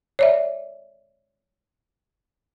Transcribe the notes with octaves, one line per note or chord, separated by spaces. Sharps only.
C#5 D5 E5